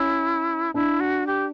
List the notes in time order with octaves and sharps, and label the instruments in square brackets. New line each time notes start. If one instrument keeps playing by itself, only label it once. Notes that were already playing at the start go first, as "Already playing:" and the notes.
Already playing: [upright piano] C#4 [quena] E4
[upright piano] D4 [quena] E4
[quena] F#4
G4